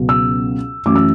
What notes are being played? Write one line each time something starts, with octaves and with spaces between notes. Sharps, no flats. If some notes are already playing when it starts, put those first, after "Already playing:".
Already playing: C#2 B2 F#3
E6
F#2 E3 A3 C#4 D6
E6